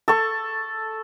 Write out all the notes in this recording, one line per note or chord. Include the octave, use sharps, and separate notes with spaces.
A4 C#6